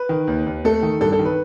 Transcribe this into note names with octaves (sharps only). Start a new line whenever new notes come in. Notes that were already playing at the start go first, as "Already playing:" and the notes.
Already playing: B4
D#3
D#2
D#2
A3 A4
D#3
G2 A4
A4
D#3
B4